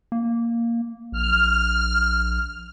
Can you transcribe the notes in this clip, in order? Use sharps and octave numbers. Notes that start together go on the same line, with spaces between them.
A#3
A#1 F6